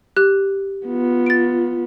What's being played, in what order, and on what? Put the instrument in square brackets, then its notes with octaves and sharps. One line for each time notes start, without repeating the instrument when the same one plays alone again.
[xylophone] G4 F#6
[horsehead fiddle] B3 F4
[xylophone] A6 D7